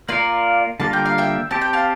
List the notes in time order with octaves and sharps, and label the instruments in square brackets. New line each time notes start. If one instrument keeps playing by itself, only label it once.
[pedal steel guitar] A#3 F4 A#4 [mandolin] D5 F5
[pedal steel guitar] D3 G3 A#3 F4 A#4 [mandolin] A5
[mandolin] G5
F5
E5 G5
[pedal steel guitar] C4 G4 C5 [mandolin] A5
[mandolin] G5
F5 A5